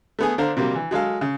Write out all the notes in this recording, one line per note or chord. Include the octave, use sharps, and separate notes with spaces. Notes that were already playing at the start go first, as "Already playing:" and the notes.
A3 B3 G#4
D3 D4 C5 F5 A#5
C3 F#3 G3 A#3
E3
F#3 G#3 A4 F5
C#3